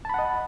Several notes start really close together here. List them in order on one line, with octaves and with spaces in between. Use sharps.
A5 B5 F#5 D#5